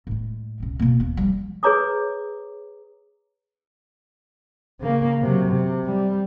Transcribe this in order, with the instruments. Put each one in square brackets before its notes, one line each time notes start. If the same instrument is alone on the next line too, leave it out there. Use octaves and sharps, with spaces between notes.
[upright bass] A2 G#3
C#2 B2
B2 A#3
D#2 B3
F3 G3
[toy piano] G#4 B4 C#5 A#5 D6 D#6
[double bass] C#3 A#3
C3 F#3
C3
G3